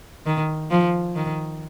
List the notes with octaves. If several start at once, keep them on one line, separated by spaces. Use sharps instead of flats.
D#3
F3
D#3